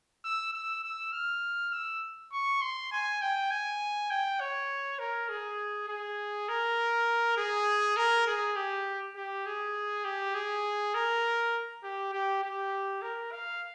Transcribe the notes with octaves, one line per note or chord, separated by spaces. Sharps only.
E6
E6
E6
F6
E6
C#6
C6
G#5
G5
G#5
G5
C#5
A#4
G#4
G#4
A#4
G#4
A#4
G#4
G4
G4
G#4
G4
G#4
A#4
G4
G4
G4
A#4
F5